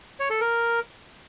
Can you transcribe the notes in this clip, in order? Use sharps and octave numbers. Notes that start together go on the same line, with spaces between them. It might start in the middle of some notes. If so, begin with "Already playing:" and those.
C#5
A4
A#4